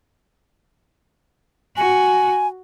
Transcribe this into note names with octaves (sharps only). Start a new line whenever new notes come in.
F#4 G#5